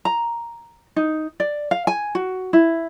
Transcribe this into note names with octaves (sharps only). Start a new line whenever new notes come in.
A#5
D#4
D5
F5
G#5
F#4
E4